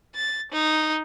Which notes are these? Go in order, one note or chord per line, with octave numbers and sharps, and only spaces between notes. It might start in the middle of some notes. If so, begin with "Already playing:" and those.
A6
D#4